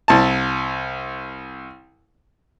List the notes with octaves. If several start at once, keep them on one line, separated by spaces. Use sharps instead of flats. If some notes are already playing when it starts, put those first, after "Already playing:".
C2 A5